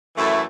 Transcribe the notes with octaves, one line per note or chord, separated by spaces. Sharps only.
F#2 E3 A3 E4